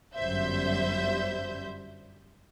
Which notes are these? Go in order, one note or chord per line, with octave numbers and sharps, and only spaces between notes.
G1 F#2 G3 C5 E5 G6